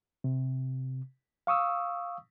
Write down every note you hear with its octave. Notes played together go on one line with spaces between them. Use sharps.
C3
F5 C#6 D#6 E6